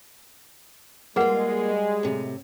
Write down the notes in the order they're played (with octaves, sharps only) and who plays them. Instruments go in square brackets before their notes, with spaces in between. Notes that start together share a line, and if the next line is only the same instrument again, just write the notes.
[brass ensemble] G3 G#3 [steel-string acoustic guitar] A#3 F4 [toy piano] G#4 B4 F#5
[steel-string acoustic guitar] A2 C3